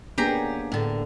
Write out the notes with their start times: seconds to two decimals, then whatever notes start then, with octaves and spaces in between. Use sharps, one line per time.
0.18 A#3 B3 C#4 D4 G4 G#4 A#5
0.72 A2 D3